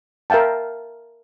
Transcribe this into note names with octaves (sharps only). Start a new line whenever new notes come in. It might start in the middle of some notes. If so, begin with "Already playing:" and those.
A#4 E5 F5 G5 A5